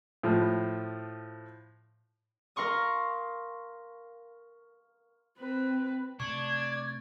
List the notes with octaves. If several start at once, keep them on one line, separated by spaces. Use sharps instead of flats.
A2 F3
A#4 F5 C6 C#6 D#6
C4 B4
C3 A3 D4 C#6 G#6